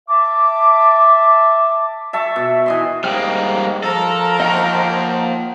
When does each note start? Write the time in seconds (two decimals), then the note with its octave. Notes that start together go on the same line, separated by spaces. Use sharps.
0.08 E5 A5 D6
2.13 E5 A5 C#6
2.36 B2
2.66 E3 D#5 C6
3.04 G#2 G3 A#3 G5 D#6 F6
3.83 F3 A4 A#4 A#5
4.40 A#3 D#5 F#5 G5 C#6